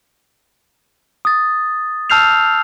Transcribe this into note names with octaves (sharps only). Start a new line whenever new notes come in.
D#6 A6
A5 E6 F6 G6 C7 F7